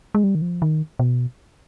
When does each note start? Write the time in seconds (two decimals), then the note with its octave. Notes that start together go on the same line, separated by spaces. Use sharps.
0.15 G#3
0.24 G3
0.35 D#3
0.42 F3
0.62 D#3
0.99 B2